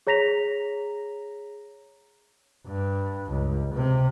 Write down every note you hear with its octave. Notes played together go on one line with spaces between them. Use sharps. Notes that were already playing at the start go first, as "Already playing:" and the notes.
G#4 C#5 A#5 A#6 B6 F7
G2
C#2
C3